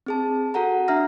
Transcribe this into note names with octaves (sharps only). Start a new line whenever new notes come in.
C4 G#4 A5
F#4 A4 F#5 A#5
D4 E5 A#5 F6 A#6